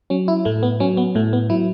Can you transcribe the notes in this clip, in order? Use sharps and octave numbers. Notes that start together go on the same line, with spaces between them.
F#3 C#4
E4
A2 A3
B3
F#3 C#4
B3
A2 A3
B3
F#3 E4